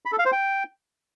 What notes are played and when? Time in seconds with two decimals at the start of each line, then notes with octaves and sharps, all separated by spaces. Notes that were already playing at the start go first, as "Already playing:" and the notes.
0.05 B5
0.12 A4
0.19 F5
0.26 C5
0.32 G5